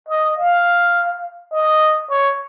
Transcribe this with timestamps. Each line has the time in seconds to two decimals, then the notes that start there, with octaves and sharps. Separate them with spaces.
0.08 D#5
0.37 F5
1.52 D#5
2.10 C#5